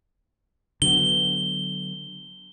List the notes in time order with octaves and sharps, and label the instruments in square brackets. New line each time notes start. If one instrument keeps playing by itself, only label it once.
[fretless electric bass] D3 F#3 B3 [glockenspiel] G7